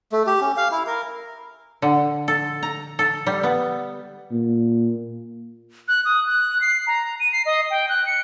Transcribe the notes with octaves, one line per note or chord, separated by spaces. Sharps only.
A3
G4
C#4
F5
E4
A#4
D3
A4
A#5
A4
G3
B3
A#2
F#6
D#6
F#6
C7
A#5
D#7
C7
D#5
G5
F#6
C#7